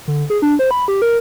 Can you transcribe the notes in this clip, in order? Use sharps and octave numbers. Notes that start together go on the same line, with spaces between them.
D3
G#4
D4
C5
B5
G4
A#4